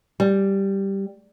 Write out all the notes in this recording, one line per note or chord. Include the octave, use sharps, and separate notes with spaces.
G3